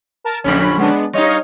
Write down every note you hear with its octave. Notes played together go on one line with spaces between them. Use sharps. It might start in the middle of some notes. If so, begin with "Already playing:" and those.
A#4 A5
A#1 F2 D3 C#4 B5
G#3 B3 D4
G3 D#4 C#5 D#5 F5